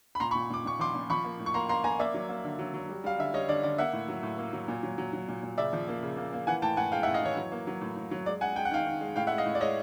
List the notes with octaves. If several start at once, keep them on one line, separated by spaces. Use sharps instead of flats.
B5
A#2 A#5 C6
B5 C#6
A#2
A#2 D6
A#2 C#6
F3 C6 D6
A#2
F3 B5 C#6
A#3
A2
C#6
A#3 A#5 C6
A#3 A#5 C6
A#3 G#5 A#5
A#3 D5 E5
F#3
A#3
D3
F#3
F#3
G3
G3 F5
D3 E5
G3 C#5 D#5
D3 D5
D3 D5
A#3 E5 F#5
A2
F#3
A2
A#3
F#3
A#2
F#3
F#3
F#3
A#2
A#2
C#3 D5 E5
F3
A#3
C#3
A#3
A#3
E3 F#5 G#5
A2 G5 A5
A2 F#5 G#5
G#3 F5 G5
E5 F#5
A2
D#5 F5
E3 C#5
F#3
A#3
F#3
A2
A2
F#3
G#3 D5
G#3 F#5 G#5
G#3 G5
F#5
D#3 F5 G5
D#3
G#3
A2 F5 G5
E5 F#5
G#3
D#5 F5
A2
D5
G#3 C#5 D#5